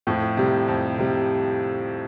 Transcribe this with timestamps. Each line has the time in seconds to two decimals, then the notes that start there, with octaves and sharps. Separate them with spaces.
0.07 F2 A2
0.37 C3 G3
0.68 F2
0.98 C3 G3